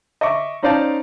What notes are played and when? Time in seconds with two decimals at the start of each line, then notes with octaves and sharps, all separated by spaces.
0.21 D#5 E5 C#6 D6
0.63 C#4 D#4 C5 D5 F5 A5